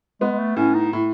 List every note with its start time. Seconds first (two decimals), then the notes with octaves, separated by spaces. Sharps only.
0.21 G#3 B3
0.32 G#3
0.39 A3
0.56 A2 C#4
0.74 D#4
0.93 A2